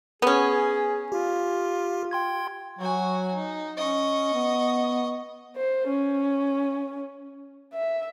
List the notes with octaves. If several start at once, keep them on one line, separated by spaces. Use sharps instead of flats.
B3 C#4 G#4
F4 G4
G5 C6 G#6
F#3 F#4 G#5
D#4
C#4 D#5 C#6
B3
C5
C#4
E5